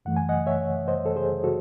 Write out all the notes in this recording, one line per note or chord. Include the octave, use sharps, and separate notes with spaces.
F#2 E3 A3 F#5
G#5
D#5 F#5
C#5 E5
C5 D#5
A4
G#4 C5
F#4 A4